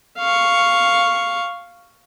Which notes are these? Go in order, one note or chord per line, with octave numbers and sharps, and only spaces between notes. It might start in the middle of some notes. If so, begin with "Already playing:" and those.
F5 C#6